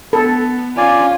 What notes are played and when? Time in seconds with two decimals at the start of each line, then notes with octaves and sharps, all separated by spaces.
0.13 B3 A4
0.77 C#4 F4 D5 G#5